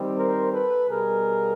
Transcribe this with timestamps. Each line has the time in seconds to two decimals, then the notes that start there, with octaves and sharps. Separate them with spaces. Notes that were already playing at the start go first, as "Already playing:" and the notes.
Already playing: D#3 G3 C4
0.16 A#4 C5
0.52 A4 B4
0.88 B2 G3 B3 G#4 A#4